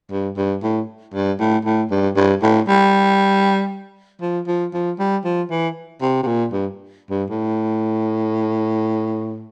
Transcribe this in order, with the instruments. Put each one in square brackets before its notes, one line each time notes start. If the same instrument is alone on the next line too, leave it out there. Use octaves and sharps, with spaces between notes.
[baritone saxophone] G2
G2
A2
G2
A2
A2
G2
G2
A2
G3
F3
F3
F3
G3
F3
E3
C3
C3
A#2
G2
G2
A2